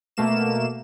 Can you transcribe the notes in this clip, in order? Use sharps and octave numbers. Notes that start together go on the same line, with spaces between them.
B2 A3 A#3 E7